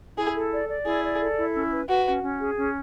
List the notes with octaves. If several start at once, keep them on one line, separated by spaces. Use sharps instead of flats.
E4 G#4
A4
D5
D5
E4 G#4
D5
A4
E4
C#4
B4
F#4 B4
C#4
C#4
G#4
C#4